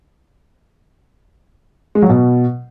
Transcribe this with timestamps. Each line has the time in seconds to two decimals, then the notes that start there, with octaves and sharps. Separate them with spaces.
1.95 G#3
2.02 F#3
2.09 B2